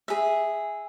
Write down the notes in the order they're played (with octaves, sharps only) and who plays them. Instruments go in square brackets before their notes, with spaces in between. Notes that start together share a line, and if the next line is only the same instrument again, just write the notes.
[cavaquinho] G#4 E5